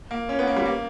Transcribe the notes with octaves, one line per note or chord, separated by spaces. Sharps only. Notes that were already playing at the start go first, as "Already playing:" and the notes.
A#3
C#4
B3
A#3
G3
A#3